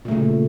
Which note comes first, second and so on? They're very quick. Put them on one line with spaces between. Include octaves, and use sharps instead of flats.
A#2 A3 C#3